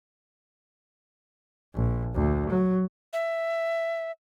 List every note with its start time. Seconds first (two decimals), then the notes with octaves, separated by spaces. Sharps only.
1.75 A#1
2.15 D2
2.50 F#3
3.13 E5